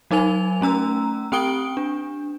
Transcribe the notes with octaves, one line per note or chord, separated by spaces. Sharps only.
F#3 D#4 A#4 G#5 F7
A3 C#4 A#5 E6
C4 G4 G5 D#6 D7 G7
D4